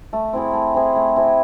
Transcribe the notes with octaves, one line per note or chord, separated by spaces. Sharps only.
A3
C4 E4 G#4
A3
C4 E4 G#4
A3
C4 E4 G#4